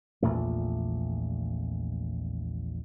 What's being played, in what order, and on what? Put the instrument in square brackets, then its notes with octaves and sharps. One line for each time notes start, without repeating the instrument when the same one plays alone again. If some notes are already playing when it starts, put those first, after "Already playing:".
[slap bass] A#1 E2 A#2 A3